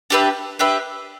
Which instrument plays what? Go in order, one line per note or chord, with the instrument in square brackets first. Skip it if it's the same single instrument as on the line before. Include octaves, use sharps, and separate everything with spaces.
[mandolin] D4 G4 B4 E5
D4 G4 B4 E5